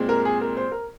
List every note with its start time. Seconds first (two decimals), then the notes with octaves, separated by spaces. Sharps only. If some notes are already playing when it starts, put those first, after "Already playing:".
Already playing: A#2 G#3 C4
0.09 A#4
0.25 G#4
0.41 A#4
0.57 C5
0.72 A#4